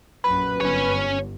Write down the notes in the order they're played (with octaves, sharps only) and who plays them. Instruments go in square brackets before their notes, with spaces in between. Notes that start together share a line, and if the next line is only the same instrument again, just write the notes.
[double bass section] A#1 F#2 [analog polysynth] B4 [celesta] B5
[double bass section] G1 [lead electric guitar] C#4 C#5